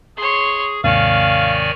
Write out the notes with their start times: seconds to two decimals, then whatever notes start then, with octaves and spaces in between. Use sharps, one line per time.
0.17 G#4 C#5 C6
0.84 D#2 G#2 C3 D#3 C#5 D5 F5 G#5